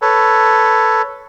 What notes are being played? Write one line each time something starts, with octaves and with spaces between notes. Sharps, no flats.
A4 B4 C#5